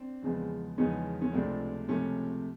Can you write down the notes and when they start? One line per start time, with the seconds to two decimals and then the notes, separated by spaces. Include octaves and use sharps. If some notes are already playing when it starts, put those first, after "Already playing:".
Already playing: C4 D4
0.22 E2 C#3 F3 G#3 B3
0.78 E2 C#3 F3 G#3 B3 C#4 D#4
1.21 C#4
1.33 C#2 C3 F3 A3 C4 D4
1.88 C#2 C3 F3 A3 C#4